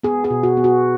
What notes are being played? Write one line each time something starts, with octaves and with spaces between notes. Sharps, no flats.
B3 G#4
G#4
B2
F#4
B3
F#4